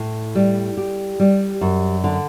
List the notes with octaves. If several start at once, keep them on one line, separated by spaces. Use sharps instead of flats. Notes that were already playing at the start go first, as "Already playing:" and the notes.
Already playing: A2
G3
G4
G3
F#2
D3